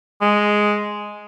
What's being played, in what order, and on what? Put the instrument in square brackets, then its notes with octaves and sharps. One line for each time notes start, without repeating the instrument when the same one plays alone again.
[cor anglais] G#3